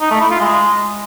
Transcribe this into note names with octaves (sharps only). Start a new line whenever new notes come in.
D#4
A3
E4
F4
G#3